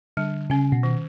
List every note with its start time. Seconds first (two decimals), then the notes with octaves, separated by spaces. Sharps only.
0.17 D3 G3
0.50 C#3 C#4
0.72 B2
0.83 D#3